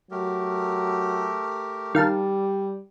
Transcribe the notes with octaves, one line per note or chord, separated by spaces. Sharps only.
F#3 A3 G4 A#4
D#3 G3 F5 A5